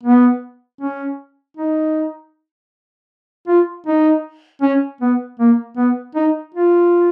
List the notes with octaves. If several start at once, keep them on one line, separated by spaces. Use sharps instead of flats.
B3
C#4
D#4
F4
D#4
C#4
B3
A#3
B3
D#4
F4